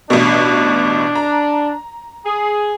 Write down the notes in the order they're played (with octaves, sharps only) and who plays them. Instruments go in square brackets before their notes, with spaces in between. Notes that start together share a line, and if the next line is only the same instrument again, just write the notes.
[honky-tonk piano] A1 B2 [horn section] D4
[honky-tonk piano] A#5
[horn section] G#4